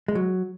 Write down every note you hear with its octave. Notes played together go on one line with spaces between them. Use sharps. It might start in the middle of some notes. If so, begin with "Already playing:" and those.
G#3
F#3